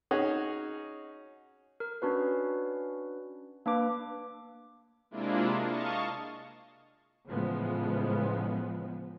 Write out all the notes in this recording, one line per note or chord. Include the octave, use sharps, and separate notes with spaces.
C#4 D#4 F#4 G#4
A#4
C#4 D4 F#4 B4
A#3 D4 B4 D6
C3 G#3 A#3 D4 E4 F4
D#5 F5 A5 C#6
A2 C#3 E3 F3 G#3 B3